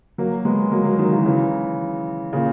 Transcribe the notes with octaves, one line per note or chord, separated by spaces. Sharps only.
F#3 A#3
G#3 B3
F#3 A#3
F#3 A#3
D#3 F#3
C#3 E3
C#3 E3
A#2 C#3